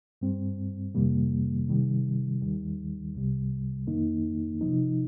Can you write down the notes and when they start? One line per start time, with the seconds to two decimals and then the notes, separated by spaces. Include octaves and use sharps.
0.21 G2 G3 C4
0.95 F2 C3 D#3 G3 A#3
1.68 C3 D#3 G3
2.42 D#2 D#3 G3
3.15 C2 C3 G3
3.87 F2 D#3 A#3 D#4
4.61 C3 F3 D#4